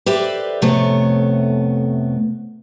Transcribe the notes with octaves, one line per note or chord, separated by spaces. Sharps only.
G4 A4 B4 C5 D5 E5
F2 A2 C3 A3 B3 C#5